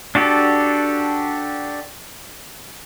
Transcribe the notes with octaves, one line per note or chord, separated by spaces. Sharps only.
D4 F#4 G4 A4